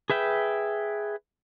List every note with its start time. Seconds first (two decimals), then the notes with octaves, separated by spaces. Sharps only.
0.10 G#4 B4 E5 G5